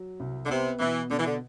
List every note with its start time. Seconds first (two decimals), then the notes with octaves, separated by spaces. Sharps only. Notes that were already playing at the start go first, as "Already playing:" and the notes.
Already playing: F#3
0.20 C2
0.45 D3
0.49 C3 B3
0.80 B2 E3
1.10 B2 D3
1.18 E3
1.25 D3